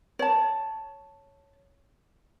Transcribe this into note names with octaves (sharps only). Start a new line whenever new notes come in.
C#5 A5